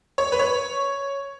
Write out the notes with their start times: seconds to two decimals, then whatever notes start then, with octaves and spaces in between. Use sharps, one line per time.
0.18 C#5
0.32 B4
0.39 C#5